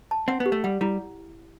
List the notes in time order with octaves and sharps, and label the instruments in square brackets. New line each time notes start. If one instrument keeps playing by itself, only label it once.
[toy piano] A5
[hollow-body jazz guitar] C4 [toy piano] F#5
[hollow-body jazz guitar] B3
[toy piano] G4
[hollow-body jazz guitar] A3
[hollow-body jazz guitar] G3 [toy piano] F#5
[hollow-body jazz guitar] G3 [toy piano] E4